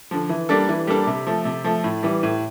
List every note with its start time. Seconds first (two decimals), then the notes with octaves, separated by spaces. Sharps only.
0.11 D3 F3
0.29 E3
0.49 G3 A#3 D4 A4
0.69 E3
0.87 G3 A#3 D4 A4
1.07 C3
1.27 F3 A3
1.45 C3
1.64 F3 A3
1.84 A2
2.03 E3 G3
2.23 A2